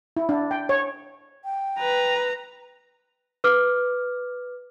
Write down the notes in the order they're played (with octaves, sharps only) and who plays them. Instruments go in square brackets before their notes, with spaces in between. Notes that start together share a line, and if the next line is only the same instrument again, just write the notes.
[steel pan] E4
D4
G5
C#5
[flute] G5
[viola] B4 [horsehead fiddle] A#5
[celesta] B4 D6 F6